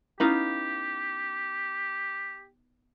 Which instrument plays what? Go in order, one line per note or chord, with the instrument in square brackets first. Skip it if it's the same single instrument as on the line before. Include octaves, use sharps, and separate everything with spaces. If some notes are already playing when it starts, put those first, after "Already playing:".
[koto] B3 D#4 F5 [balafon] C#4 E4 [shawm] G4